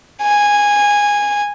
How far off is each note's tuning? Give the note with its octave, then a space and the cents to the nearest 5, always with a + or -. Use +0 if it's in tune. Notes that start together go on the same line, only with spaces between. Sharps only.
G#5 -10